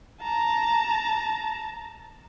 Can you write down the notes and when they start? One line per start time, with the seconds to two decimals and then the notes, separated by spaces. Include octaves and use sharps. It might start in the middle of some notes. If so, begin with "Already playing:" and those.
0.22 A5 A#5